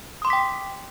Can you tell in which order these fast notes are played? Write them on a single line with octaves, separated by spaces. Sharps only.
D#6 C6 D6 B6 G5